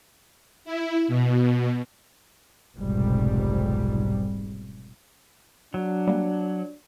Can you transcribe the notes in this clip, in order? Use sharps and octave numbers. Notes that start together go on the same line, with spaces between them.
E4
B2
F1 B1 G#2 G3
F#3 D4
G3 A#3